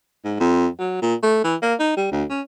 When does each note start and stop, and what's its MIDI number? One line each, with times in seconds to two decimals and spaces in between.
0.25 0.39 44
0.40 0.67 41
0.79 0.97 54
1.02 1.14 46
1.22 1.42 57
1.44 1.55 52
1.62 1.74 58
1.79 1.94 63
1.97 2.10 55
2.11 2.24 38
2.30 2.41 61